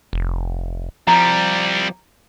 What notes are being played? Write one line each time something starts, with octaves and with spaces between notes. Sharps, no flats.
F1
C2 F3 G3 A#5